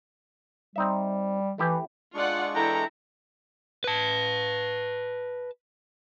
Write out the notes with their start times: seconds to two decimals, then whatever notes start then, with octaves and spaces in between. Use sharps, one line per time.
0.76 G3 C4 D#4 E5
1.58 E3 A3 E4 G4
2.14 G#3 D4 F4 D5 F#5 C#6
2.55 E3 E4 A4 G5 A#5
3.84 B4 A5